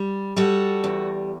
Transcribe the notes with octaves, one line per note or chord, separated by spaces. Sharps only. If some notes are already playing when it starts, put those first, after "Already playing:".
Already playing: G3
G3 F#4 A4
E2